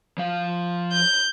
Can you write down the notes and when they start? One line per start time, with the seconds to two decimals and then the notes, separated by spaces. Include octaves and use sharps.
0.18 F3 F5
0.93 G6